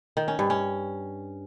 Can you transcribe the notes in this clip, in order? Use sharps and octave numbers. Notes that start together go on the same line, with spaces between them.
D#3
C#4
G2
C#4